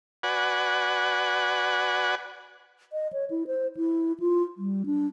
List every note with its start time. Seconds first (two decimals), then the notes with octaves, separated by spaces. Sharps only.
0.23 F#4 B4 D5 F#5 G#5
2.92 D#5
3.13 C#5
3.30 E4
3.47 C5
3.77 E4
4.20 F4
4.58 G3
4.86 D4